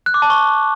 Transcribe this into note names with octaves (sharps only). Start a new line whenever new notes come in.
F#6
D6
A5
C#6